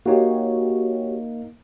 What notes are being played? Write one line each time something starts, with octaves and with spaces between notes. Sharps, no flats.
A#3 D#4 F#4 G4 C#5